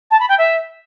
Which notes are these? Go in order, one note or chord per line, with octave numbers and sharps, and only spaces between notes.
A5
B5
G5
E5